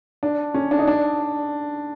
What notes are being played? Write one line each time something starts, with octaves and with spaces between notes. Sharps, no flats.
D4
C#4
D4
D#4
D4